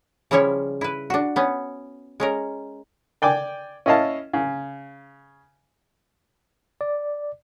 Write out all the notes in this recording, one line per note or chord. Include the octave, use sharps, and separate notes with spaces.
C#3 F3 G3 C#4 E4 C#5
E4 B4
D4 F#4
B3 C#4
G#3 C#4 A#4
D5 G5 G#5 D6
C#4 E4 D#5 F5 A5
C#3
D5